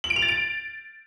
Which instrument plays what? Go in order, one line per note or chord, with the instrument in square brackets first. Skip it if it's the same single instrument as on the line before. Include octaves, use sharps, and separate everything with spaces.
[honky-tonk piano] F#7
D7
F7
A6
D7